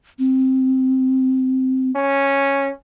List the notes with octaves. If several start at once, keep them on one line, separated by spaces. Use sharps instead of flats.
C4
C#4